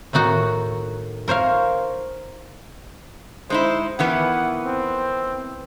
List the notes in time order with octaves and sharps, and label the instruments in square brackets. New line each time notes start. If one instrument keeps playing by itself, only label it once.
[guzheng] A2 D#3 D#4 F#4
A#4 C5 C#5 F5
[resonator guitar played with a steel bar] G#3 D#4 E4 [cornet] C5
[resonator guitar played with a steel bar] D#3 E3 B3 [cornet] F#5
[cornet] C4